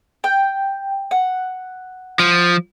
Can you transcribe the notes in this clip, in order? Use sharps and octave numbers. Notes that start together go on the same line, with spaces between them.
G5
F#5
F3